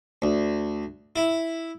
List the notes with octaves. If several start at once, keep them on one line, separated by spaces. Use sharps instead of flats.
D2
E4